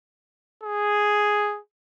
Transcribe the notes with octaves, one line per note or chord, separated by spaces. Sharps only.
G#4